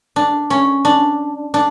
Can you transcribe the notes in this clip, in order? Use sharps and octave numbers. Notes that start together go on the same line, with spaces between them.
D4
C#4
D4
D4